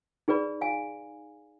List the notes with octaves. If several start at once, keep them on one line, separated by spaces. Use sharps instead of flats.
D#4 G#4 B4 D5 B5
F5 G#5